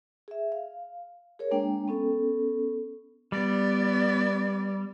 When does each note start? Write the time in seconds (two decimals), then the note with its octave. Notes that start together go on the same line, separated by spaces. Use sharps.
0.28 G#4 E5
0.52 F5
1.39 G#4 A#4 C#5
1.51 G#3 A#3 D4 G5
1.88 B3 C#4 A4
3.32 G3 B3 D5